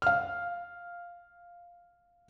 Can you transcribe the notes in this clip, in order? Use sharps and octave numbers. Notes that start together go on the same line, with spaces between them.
F5 F6